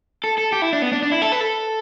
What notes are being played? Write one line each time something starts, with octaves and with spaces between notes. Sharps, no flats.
A4
A4
G4
E4
D4
B3
D4
D4
E4
A4
B4
A4